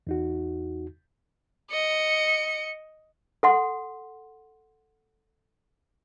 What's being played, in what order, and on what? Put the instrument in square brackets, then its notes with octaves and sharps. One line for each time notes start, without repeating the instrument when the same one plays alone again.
[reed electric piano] E2 D#4 F#4
[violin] D#5 C#7
[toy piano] A4 F#5 C6